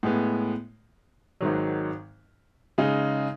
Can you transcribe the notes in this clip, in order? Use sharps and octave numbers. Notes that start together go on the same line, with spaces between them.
A2 G#3 B3
G#1 G#2 D#3 F#3
C#3 G#3 D#4